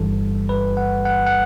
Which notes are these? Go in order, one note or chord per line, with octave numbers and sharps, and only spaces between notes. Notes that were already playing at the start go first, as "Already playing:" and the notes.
Already playing: G1 G2 E3 G3 A4
B4
F#5
F#5
F#5